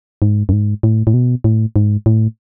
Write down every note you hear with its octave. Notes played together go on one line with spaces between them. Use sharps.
G#2
F#2
G#2
A2
A2
B2
A2
G#2
A2